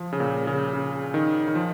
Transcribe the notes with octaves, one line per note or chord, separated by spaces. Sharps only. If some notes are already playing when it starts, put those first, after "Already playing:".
Already playing: F3
C#3
A#2
C#3
C#3
D#3
D#3
F3